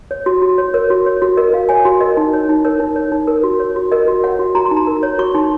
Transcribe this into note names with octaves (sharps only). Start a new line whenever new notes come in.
C#5
F#4
F#4
C#5
A#4 C#5
F#4
C#5
F#4
A#4 D#5
F#4 F5
C#5 G#5
F#4
A#4 D#5
D#4
C#5
D#4
A#4 C#5
D#4
C#5
D#4
A#4
F#4
C#5
F#4
A#4 D#5
F#4
C#5 F#5
F#4
F#4 A#5
C6
D#4
A#5
A#4
C#5
F#4 C#6
D#4 C6